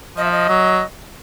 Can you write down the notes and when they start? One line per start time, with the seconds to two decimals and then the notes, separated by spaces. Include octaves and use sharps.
0.17 F3 D#5
0.24 E5
0.32 D#5
0.48 F#3